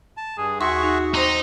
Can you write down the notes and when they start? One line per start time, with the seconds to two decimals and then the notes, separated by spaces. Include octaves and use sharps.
0.17 A5
0.38 G2 G#4
0.60 D#2 F#4 G#4 E5 C6 C#6
0.83 D#4 F#4
1.14 C4 D#4 C5 A#5 D6